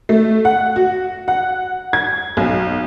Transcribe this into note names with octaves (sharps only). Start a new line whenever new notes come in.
A3
F#5
F#4
F#5
G#6
B1